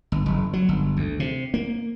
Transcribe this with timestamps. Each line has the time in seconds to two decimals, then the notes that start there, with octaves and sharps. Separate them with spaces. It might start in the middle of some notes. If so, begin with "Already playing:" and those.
0.12 G1
0.26 F#1
0.53 F#3
0.69 G1
0.97 D2
1.20 C3
1.54 A#3